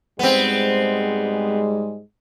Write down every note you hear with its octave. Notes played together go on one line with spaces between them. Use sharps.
G#2 G3 G#3 B3 C4